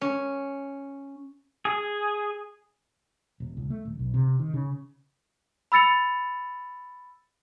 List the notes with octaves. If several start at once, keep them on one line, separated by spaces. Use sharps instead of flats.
C#4
G#4
D#1
C#2
A3
D#1
B1
C3
D#3
C#3
B5 E6 A6 C#7 F7